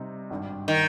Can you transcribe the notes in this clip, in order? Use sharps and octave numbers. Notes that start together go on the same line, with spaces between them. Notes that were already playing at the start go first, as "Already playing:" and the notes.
Already playing: C3 G3 C4 D#4
G#1 G2 G3
D#3